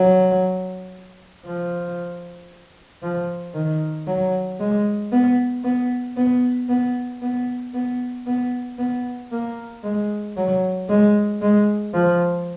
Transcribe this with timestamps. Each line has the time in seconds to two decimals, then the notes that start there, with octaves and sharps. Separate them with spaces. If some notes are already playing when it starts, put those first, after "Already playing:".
Already playing: F#3
1.46 F3
3.02 F3
3.54 D#3
4.07 F#3
4.60 G#3
5.12 B3
5.64 B3
6.17 B3
6.69 B3
7.22 B3
7.74 B3
8.27 B3
8.79 B3
9.32 A#3
9.84 G#3
10.37 F#3
10.89 G#3
11.42 G#3
11.94 F3